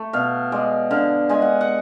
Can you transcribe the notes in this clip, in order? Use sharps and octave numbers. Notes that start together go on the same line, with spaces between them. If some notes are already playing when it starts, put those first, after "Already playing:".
Already playing: A3
B2 F5
G#3 D5
D3 F5
G#3 G#5
F#5
F#5